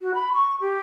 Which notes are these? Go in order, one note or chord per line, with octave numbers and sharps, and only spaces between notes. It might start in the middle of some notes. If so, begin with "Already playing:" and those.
F#4
B5
C#6
G4